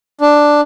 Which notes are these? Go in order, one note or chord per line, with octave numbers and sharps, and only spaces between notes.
D4